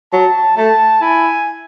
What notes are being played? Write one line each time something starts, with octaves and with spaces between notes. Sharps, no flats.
F#3 A5
A3 A5
E4 G#5